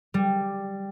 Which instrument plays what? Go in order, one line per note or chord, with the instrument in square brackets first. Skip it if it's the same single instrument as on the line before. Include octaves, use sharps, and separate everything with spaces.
[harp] G3